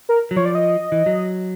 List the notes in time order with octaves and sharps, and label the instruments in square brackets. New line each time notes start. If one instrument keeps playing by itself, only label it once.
[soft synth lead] A#4
[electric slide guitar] F#3
[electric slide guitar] F3 [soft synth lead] C#5
[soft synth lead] D5
D#5
[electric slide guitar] E3
F#3